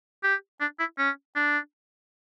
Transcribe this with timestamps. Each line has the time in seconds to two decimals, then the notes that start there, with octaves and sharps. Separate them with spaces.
0.24 G4
0.61 D4
0.79 E4
0.98 C#4
1.36 D4